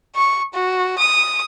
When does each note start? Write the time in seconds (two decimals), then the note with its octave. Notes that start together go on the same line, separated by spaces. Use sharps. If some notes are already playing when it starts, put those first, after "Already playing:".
0.15 C#6
0.54 F#4
0.98 D#6